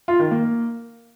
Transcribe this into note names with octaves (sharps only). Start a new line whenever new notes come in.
F4
D#3
A#3